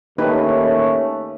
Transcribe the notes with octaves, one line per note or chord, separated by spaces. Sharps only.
D#2 A3 C#4 D#4 G4 B4